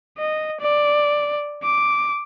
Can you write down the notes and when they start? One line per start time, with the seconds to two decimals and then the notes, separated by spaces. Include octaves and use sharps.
0.18 D#5
0.61 D5
1.63 D6